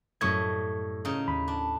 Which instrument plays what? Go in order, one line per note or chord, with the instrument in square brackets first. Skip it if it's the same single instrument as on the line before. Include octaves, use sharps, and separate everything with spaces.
[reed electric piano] F#2 C#6 G#6 [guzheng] A2 G3 D#5
[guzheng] C#3 D#4
[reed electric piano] D#2 B5
[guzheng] D4